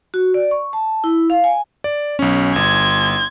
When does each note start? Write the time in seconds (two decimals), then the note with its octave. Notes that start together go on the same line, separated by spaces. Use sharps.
0.14 F#4
0.34 D5
0.51 C#6
0.73 A5
1.04 E4
1.30 F5
1.44 G#5
1.84 D5
2.19 B1 C#4
2.56 G1 C6 G#6